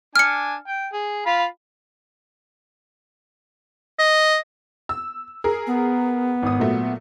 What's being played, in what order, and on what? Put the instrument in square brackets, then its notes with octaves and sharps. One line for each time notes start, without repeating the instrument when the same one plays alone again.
[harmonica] D4 G#5 [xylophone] F6 C#7
[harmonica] G5
G#4
F4 F5 B5
[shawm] D#5
[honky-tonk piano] E6
G#4 A#4
[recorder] B3
[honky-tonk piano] G#1 D#6
A#2 F#3 A3